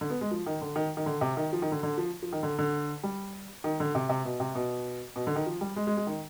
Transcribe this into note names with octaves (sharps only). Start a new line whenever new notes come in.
D3
B3
G#3
F3
D#3
D3
D#3
D#3
D3
C3
D#3
F3
D#3
D3
D3
F3
F3
D#3
D3
D3
G3
D#3
D3
C3
C3
B2
C3
B2
B2
D3
D#3
F3
G3
G#3
G#3
G#3
D#3